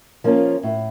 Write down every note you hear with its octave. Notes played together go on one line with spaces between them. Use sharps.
F3 A#3 C#4 F4
A2